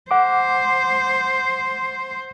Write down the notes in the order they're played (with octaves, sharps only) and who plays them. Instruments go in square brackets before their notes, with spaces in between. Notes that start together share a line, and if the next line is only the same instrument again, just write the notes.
[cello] C5 [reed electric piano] F#5 D6